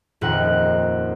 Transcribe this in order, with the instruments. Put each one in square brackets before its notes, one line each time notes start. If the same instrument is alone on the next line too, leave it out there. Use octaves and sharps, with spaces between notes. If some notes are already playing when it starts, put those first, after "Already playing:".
[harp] D#1 F2 D#3 F#5